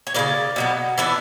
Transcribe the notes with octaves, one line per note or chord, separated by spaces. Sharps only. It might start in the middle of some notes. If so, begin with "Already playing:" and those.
C#5
C#3 E3 A#3 D5
B2 F#3 B3
E3 B3 D4 E5